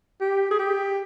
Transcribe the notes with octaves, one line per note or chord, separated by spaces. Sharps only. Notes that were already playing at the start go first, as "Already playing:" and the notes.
G4
G#4
G4